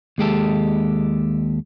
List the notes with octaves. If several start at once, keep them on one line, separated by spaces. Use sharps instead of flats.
D#2 G#3 G4 A4